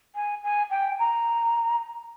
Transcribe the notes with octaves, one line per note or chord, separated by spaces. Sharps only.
G#5
G#5
G5
A#5